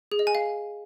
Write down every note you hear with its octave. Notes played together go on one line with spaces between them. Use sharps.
G#4
D#5
G#5
F5